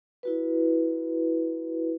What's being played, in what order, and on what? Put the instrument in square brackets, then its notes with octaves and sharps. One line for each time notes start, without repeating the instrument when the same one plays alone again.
[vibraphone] E4 F#4 B4